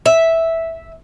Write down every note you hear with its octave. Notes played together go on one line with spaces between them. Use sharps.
E5